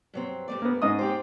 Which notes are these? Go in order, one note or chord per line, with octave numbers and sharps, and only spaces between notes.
G2 F#3 C4
G2 A3 D5
A#3 B3
G#2 D#5 D#6
C4 G4 C5